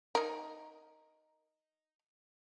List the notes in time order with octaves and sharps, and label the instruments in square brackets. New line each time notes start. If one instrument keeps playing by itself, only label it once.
[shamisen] D#4 A#4